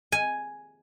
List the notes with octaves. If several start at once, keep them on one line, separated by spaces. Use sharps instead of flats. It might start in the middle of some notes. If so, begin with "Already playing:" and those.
G#5